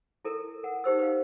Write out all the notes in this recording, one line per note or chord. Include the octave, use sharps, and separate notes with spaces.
E4 A4 A#4
A#4 F#5
D#4 G4 C5 E6
B4 F5